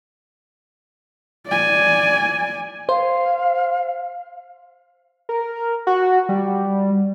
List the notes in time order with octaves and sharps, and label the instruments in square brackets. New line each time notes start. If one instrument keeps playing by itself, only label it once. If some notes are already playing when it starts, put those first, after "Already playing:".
[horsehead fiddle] D5 G#5
[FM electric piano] C5 [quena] F5
[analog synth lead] A#4
F#4
G3